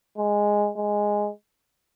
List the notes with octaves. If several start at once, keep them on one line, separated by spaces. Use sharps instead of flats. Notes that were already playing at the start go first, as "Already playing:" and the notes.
G#3
G#3